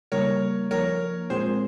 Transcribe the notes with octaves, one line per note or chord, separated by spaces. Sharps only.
C#3 G3 A#3 D#4 A#4 C#5
F3 A#3 D#4 A#4 C#5
A#2 G#3 C4 F4 G#4 A#4 C5